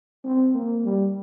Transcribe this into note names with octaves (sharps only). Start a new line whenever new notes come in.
C4
A#3
G3